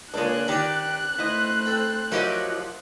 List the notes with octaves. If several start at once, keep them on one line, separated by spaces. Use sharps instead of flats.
C#2 A#2 G#3 D4 C#5 F#6
D#3 G4 D5 A#5
A3 E4 C5 D#5
C4 A4
F3 F#3 E4 G4 A#4 C5 D#5